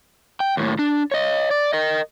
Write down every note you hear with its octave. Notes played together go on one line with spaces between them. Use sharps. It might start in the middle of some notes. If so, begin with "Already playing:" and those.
G5
D#2 A2
D4
C#5 D#5
D5
A#4 D#5